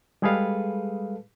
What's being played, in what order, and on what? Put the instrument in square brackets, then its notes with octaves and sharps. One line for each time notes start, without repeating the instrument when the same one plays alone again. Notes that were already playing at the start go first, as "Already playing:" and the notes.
[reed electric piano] G3 G#3 G#4 A4 B4 F5